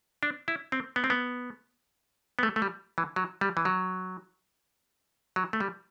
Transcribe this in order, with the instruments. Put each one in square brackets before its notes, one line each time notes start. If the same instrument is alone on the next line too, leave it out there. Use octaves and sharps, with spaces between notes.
[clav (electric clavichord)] D4
E4
C4
B3
C4
B3
B3
A3
A3
G3
E3
F#3
G3
E3
F#3
F#3
A3
G3